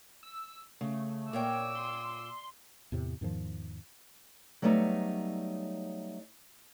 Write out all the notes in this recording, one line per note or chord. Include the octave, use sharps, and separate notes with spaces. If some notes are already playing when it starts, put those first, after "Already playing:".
E6
C#3 A3
A#2 A#4 C#5 G5 D6 E6
C6
E2 A2 C3
E2 G#2 D#3 F3
F#3 G3 A3 B3 C4 D#4